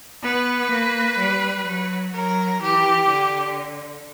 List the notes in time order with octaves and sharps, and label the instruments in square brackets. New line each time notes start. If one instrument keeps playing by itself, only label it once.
[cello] B3 [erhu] B4
[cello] A#3
G3
F#3
[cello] F#3 [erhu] A#4
[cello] E3 [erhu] G4
[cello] D3